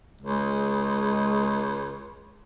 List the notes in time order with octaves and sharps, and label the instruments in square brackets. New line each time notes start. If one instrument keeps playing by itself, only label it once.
[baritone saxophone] C#2 [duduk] G#3